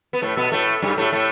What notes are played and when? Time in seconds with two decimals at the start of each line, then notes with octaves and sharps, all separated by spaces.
0.13 B3
0.22 A2 A3
0.37 B2 B3
0.52 A2 A3
0.82 G2 G3
0.97 A2 A3
1.12 A2 A3